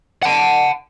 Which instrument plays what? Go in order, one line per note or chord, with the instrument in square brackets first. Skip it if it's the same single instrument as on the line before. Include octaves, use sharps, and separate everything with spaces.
[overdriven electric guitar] F#5 A5